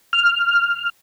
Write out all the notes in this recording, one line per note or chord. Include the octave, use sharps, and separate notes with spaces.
F6